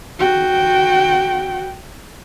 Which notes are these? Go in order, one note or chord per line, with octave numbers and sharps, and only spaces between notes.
F#4 G5